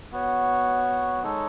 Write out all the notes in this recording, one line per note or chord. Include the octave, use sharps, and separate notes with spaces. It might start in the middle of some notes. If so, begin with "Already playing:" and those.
B3 F#4 C#5
G#3 D#4 A4 C#5